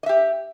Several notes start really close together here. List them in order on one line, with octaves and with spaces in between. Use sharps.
D#5 E5 G4